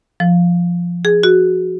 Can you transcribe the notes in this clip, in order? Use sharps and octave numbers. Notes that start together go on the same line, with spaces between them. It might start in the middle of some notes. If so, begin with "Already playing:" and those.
F3
G#4
F#4